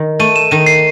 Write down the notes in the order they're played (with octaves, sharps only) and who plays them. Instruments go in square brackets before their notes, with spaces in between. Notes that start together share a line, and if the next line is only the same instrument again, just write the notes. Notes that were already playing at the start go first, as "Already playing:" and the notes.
Already playing: [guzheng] D#3
[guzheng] A3 [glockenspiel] D#7
[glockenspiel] E7
[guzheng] D#3 [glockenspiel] D#7
[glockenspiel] C7